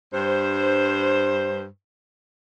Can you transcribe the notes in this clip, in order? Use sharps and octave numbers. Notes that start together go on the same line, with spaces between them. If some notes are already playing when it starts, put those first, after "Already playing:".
G2 C5